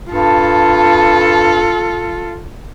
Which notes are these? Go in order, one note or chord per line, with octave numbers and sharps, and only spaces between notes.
G2 F4 A4